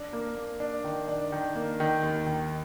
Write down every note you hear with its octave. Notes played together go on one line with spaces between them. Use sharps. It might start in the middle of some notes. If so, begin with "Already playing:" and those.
Already playing: D4
A#3
A#3
D4
D#3
D4
D#3
A#3
D#3
D#2
D#3